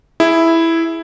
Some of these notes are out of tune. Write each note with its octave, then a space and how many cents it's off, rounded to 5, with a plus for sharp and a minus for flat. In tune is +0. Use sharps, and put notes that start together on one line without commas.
E4 +0 G#4 +0